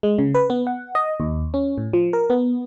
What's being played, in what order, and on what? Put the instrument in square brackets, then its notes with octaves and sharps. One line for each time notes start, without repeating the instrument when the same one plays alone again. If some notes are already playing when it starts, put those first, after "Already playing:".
[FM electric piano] G#3
C#3
B4
B3
F#5
D#5
D#2
C#4
A2
F3
A#4
B3